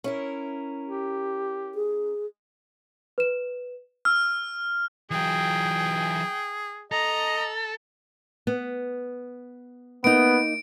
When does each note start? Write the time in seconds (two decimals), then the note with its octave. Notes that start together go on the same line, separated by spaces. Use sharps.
0.04 C#4 E4 A#4
0.84 G4
1.75 G#4
3.18 B4 E7
4.05 E6 F6
5.11 E3 F#3 G#4 G5
6.91 A4 D#5 A#5
8.47 B3
10.04 A#3 B3 D#4 D7